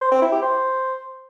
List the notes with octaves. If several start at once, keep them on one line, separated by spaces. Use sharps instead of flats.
C5
C4
E4
G4
C5